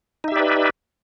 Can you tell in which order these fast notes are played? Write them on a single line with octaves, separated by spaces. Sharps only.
D#4 E5 G4 D5 B4